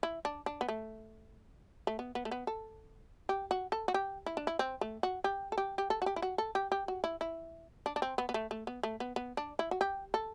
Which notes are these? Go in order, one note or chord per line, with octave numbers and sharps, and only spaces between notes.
E4
D4
D4
B3
A3
A3
B3
B3
A3
B3
A4
G4
F#4
A4
F#4
G4
E4
D4
E4
C4
A3
F#4
G4
A4
G4
G4
A4
F#4
G4
E4
F#4
A4
G4
G4
F#4
E4
E4
D4
D4
C4
B3
B3
A3
A3
B3
A3
B3
B3
D4
E4
F#4
G4
A4